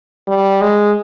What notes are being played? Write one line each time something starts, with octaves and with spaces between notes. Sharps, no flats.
G3
G#3